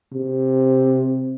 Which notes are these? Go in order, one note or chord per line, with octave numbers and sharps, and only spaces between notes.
C3